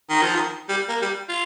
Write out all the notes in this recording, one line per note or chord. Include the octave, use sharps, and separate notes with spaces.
D#3
F3
D#3
G3
A#3
G3
F4